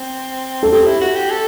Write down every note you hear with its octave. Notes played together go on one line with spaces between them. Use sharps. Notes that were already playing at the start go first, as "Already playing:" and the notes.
Already playing: C4
A4
C4 G4
E4
F#4
G4
A4